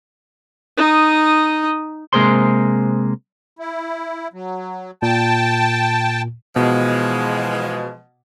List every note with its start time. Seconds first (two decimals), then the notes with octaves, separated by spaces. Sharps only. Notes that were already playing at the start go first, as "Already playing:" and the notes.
0.77 D#4 D#6
2.13 C3 G#3 A#3 G#4 C5 C6
3.59 E4
4.33 F#3
5.02 A#2 G5 A5
6.56 B2 E3 F3 G#3